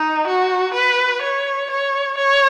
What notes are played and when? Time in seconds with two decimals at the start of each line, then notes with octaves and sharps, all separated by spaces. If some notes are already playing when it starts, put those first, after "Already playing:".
Already playing: D#4
0.27 F#4
0.74 B4
1.22 C#5
1.71 C#5
2.18 C#5